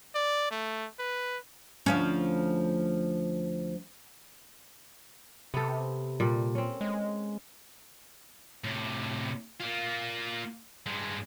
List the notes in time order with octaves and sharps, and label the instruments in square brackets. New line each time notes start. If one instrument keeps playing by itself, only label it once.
[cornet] D5
A3
B4
[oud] D2 F3 C#4
[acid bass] C3 [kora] B3 A4
[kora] A#2 G3 A4
C4 C#4
[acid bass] G#3
[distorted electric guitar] A2 C3
A#3 F4
G2 G#3